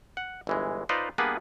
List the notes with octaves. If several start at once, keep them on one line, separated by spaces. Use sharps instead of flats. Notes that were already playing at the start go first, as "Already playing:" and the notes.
F#5
G1 E3 G#3
D#4 F4 B4 C5 D5 D#5
G3 A#3 B3 D4 G#4 B4